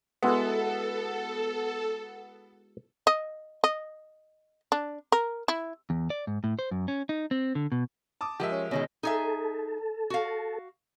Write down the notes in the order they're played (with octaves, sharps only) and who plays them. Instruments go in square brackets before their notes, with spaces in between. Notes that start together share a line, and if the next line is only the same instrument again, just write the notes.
[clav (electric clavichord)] G#3 E4 F#4 [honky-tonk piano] B3 [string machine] A4
[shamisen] D#5
D#5
D4
A#4
E4
[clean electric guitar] E2
D5
G#2
A2
C5
F#2
C#4
D#4
C4
D3
B2
[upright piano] A5 D6 D#6
[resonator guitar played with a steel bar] F3 G#3 [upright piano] G4 A#4 E5
[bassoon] C#4
[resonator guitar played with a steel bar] B2 D#3 G#3 [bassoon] C#4
[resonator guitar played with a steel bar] D#4 G#4 E5 [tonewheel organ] A4
[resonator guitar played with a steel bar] F#4 F5